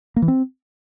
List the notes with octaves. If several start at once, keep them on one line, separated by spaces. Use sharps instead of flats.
A#3
E3
C4